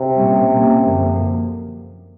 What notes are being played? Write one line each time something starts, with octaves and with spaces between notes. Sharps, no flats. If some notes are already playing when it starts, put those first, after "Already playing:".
Already playing: C3
A#2 G3 A#3 C#4
A#2 G3 A#3 C#4
F#2 D3 F3 A#3